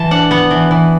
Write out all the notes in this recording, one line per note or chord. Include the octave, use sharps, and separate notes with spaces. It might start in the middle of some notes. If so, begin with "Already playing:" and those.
Already playing: E3 B3 A5
D4 F#5
B3 F#5
E3
E3